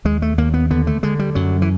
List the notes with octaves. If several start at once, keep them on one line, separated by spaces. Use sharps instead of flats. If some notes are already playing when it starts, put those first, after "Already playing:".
D#2 G#3
A3
D#2 A#3
B3
D3 B3
A3
D3 G#3
G3
F#2 F#3
E3